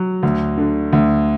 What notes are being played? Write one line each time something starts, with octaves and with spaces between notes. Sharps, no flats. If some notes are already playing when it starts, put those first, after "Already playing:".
Already playing: F#3
D2
D3
D2